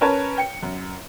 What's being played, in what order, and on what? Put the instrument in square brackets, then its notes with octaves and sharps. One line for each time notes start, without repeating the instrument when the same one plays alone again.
[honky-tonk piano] C#4 A#4 B4 C#5 A5
G5 C#7
F#2